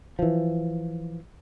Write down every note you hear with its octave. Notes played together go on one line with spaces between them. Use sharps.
E3 F3